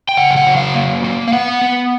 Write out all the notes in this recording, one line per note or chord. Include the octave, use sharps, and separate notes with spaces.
G5
C#3 F#5
G5
F#5
F#3
F5
A#3
A#3
F5
B3 F#5
B3